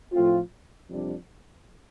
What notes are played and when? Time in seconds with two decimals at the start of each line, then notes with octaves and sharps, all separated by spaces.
0.13 A2 F3 A3 C4 F4
0.88 F2 C3 G3 D4